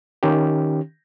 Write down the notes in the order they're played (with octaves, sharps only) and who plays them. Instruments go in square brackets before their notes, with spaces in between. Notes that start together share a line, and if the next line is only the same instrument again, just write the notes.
[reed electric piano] D#3 C#4 G4